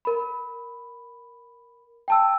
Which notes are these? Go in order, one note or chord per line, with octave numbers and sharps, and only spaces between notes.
A#4 B5
G5 A5 E6